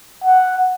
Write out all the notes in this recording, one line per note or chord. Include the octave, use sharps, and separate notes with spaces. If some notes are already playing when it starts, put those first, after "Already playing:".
F#5